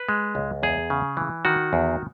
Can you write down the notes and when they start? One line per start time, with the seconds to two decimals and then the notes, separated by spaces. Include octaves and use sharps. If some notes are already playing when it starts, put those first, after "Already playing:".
Already playing: B4
0.09 G#3
0.35 C#2
0.63 E2 G#4
0.90 C#3
1.17 E3
1.45 D#3 F#4
1.73 E2